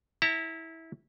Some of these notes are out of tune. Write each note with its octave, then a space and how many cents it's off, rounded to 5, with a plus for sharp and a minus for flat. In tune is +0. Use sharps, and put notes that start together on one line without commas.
E4 -20 F#5 +0 A#5 -40